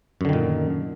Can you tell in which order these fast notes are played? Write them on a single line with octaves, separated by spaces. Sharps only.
F#2 D3 D#3 A#2